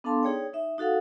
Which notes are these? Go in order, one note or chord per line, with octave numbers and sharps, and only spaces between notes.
B3 D4 A4 F5 A5 C6
D#4 G#4 C#5 D5 G5
D#4 E5
D#4 F#4 A4 F5 F#5